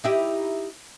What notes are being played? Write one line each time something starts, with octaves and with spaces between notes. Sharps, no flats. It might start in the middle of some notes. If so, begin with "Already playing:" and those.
D#4 E4 G4